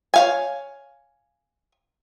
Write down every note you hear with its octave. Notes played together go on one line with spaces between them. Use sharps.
C#5 F5 G#5